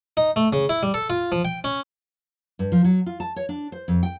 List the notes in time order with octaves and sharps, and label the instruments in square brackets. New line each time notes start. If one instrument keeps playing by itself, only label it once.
[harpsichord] D#4
A3
C#3
E4
G3
A4
F4
F3
G5
C#4
[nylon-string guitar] G2
F3
F#3
F4
A5
C#5
D4
C5
F2
G5